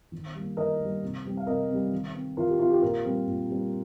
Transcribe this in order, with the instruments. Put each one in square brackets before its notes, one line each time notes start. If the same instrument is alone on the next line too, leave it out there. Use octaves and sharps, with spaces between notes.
[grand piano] D#3
G3 A#3
D#3 A#4 D#5
G3 A#3
C3
G3 C4
F5
C3 A#4 D#5
G3 C4
D#3
C4
D#3 F4 A#4
G4
C4 F4
G4
A#2 F4 A#4
G3 C4
A#2
G3 C4